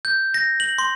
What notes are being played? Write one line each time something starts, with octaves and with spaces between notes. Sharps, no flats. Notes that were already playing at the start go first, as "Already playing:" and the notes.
G6
A#6
F#7
C6